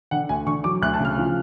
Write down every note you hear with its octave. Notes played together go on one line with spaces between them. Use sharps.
D3 F#5
D2 G#5
D3 C#6
F#3 D6
D2 F#6
A5
C#3
F6
F3